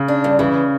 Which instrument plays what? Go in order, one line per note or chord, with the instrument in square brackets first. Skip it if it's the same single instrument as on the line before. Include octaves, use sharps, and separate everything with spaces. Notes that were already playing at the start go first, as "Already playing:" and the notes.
Already playing: [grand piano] C#3
[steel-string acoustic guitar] D4
G2
[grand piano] C#3 [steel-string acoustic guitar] E3